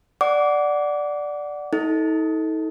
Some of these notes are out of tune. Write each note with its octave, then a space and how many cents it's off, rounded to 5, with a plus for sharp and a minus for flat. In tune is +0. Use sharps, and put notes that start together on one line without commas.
D5 +0 F#5 +0 D6 -25
D#4 +40 A4 +0